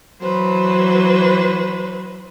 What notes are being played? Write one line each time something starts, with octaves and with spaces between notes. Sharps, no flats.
E3 F#3 B4 C5